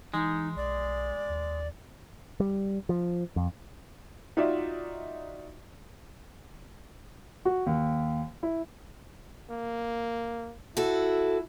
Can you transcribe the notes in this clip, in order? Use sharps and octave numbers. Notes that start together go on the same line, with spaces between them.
E3 G#3 D#4
B1 D5
D#2
G3
F3
F2
D#4 F4 F#4 D5 E5
F#4
D#2
E4
A#3
E4 F#4 A4